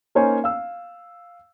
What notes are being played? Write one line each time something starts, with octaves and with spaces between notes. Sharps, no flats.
A#3 C#4 D#4 C5 C#5 G#5
F5 E6